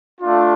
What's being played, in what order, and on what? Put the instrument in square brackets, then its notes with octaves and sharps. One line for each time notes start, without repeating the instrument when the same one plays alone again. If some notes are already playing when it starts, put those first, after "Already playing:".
[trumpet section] A3 D4 F4